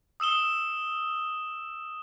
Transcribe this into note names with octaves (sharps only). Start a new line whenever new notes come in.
D#6 E6 E7 G7